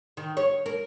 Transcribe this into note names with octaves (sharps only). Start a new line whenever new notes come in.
D#3
C#5
A#4